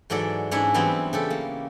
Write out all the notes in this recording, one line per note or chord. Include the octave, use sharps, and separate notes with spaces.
G#2 E3 F#3 A4 D5
G#2 C#4 D4 E4 F#5
E3 F#3 G3 B3 C4 E4
C#3 G4 A4
A#3